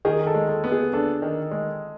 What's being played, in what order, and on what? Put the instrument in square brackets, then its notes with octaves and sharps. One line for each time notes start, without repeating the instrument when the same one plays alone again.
[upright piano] D#3 [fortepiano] G#4
[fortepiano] A4
[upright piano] G#3
[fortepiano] A4
[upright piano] B3
[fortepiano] G#4
[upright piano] D4 [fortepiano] A4
[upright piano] D#3
G#3